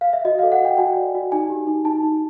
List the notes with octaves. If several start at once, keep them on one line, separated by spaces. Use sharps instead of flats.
F5
E5
F#4 D#5
A4 F5
F#5
F#4 G5
F#4 G#5
D5
F#4
D#4 G#5
G4
D#4
D#4 A5
D#4